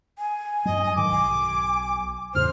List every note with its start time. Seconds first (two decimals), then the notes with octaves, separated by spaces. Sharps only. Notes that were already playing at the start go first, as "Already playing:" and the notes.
0.19 G#5
0.65 G2 F#3 D#5
0.95 G#2 D#3 D6
1.11 B1 G#5
2.34 E2 A2 C#3 C5 F6